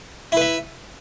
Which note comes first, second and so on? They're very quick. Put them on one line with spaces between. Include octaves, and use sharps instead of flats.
E4 B4 E5